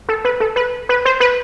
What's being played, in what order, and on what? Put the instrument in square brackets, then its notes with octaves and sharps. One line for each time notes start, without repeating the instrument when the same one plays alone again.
[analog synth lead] A4
B4
A4
B4
B4
C5
B4